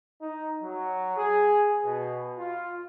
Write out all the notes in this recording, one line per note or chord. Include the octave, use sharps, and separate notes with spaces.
D#4
F#3
G#4
B2
F4